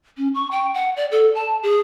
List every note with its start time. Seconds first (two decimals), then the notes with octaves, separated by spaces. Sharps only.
0.17 C#4
0.34 C#6
0.51 G5
0.74 F#5
0.96 D5
1.11 A4
1.35 A5
1.63 G#4